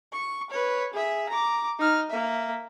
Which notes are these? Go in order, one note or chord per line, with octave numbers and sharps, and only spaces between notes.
C#6
B4 C#5
G#4 E5
A#5 D6
D#4 F6
A#3 E5